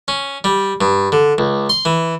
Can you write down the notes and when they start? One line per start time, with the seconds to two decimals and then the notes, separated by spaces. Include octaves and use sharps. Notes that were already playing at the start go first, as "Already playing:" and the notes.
0.08 C#4
0.44 G3
0.81 G2
1.12 D3
1.38 C#2
1.69 C6
1.85 E3